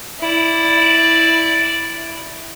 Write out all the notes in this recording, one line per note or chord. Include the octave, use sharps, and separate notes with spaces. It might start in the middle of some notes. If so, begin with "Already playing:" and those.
E4 D5